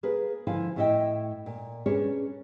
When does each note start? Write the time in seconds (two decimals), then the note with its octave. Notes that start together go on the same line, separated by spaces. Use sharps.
0.03 A#3 G#4 A#4 B4
0.47 D3 F3 E4 F5 G#5
0.76 A2 A3 E4 D#5 E5 G5
1.46 A#2
1.86 C#4 D4 G#4 A#4 B4 C#5